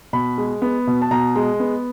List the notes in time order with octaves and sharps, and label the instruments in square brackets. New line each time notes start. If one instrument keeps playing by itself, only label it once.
[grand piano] B2 B5
G#3
B3
B2
A5
B2 A#5
G#3
B3